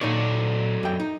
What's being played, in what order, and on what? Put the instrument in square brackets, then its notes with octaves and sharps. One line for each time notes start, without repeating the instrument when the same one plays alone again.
[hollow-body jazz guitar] A#2 D#4 C#5 [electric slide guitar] F#3 A4 D5
[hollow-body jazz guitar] F#2 G5
D#4